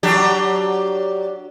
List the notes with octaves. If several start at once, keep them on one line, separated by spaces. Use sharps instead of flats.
F#3 D4 G4